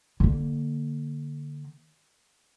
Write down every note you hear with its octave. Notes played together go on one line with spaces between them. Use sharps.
D3 A#3